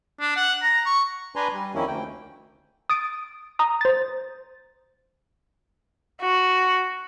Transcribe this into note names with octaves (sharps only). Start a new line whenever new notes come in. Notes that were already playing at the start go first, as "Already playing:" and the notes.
D4
F#5
A#5
C#6
D4 B4 G#5 A#5 C6
G3
F2 D#3 A#3 C#4 E4
D2 G5
D#6 A6 D7
A#5 D#6
C5 A6
F#4